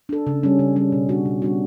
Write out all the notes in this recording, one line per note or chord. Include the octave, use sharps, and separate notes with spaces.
D4 A4
C#3
G3 C#4
C#3
G3 C#4
B2
G3 D4 F#4
B2
G3 D4 F#4